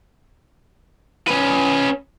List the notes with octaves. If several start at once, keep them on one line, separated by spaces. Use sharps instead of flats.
C#4 B4